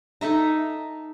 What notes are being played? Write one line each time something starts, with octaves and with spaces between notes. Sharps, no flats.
D#4 A4 E5 A#5